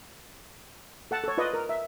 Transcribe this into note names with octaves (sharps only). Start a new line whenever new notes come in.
A4 F#5 A5
A4 C#5
F4 B4 D5 D#5
A#4
E5